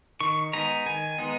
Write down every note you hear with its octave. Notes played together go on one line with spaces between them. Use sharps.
D#3 C#6
G#3 B3 D#4 A#5
D#3 G#5
G#3 B3 D#4